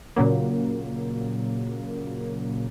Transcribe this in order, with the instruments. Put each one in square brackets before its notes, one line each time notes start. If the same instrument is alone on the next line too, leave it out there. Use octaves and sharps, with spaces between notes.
[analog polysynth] A#2 C#3 F#3 A#3